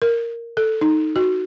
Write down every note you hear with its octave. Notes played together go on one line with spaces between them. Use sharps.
A#4
A4
D#4
F#4